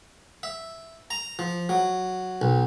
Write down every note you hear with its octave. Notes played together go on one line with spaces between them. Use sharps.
E5
A#5
F3
F#3
B1